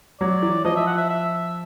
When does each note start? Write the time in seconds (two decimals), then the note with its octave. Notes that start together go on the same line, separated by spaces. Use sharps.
0.20 F#3 D5
0.42 E3
0.64 F3 D#5
0.76 E5
0.87 F#5
0.97 E5
1.10 E5